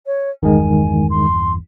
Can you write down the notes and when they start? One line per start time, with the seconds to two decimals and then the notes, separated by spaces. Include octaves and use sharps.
0.06 C#5
0.43 G1 E2 D#3 G#3 G#5
1.10 C6